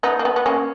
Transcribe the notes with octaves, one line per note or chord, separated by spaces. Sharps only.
B3 D#4
A#3
B3
B3
A#3 C#4